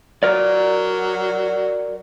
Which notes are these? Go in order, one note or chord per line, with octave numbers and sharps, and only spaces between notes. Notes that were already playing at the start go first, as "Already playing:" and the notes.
F#3 A#4 D5